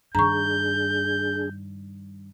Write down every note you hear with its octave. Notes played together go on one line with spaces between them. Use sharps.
G2 D#3 D4 G#4 A#5 C#6 G6